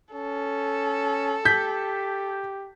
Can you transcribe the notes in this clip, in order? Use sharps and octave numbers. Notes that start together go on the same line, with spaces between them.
C#4 A4
G4 G6 B6